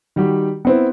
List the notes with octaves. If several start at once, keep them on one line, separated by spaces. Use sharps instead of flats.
D#3 G3 F#4 G4
B3 C4 E4